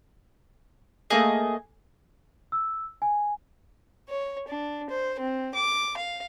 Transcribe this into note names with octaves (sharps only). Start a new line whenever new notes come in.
A3 A#3 G#4 D#5
E6
G#5
C#5
D4
C5
C4
D6
F5